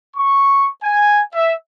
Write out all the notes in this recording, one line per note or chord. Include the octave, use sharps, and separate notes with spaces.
C#6
G#5
E5